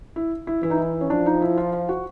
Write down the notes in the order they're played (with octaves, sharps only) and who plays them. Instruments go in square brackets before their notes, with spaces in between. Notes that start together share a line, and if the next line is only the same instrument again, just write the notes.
[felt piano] E4
E4
[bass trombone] E3 [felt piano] E4
[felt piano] D#4
E4
C#4
[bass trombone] F3 [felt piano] D4
[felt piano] D#4
E4
F4
F4
F#4